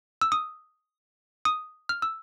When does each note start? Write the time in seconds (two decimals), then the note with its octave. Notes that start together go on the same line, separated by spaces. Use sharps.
0.21 E6
0.32 D#6
1.45 D#6
1.89 F6
2.02 E6